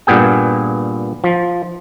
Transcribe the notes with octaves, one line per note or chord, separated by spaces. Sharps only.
G2 A#2 B3 G#4 G5
F3